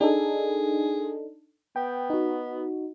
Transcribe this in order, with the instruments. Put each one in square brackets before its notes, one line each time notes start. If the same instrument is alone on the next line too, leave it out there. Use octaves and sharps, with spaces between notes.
[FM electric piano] D4 D#4 A4 [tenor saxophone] G#4
[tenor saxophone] B3 [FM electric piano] G5
[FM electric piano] D#4 F#4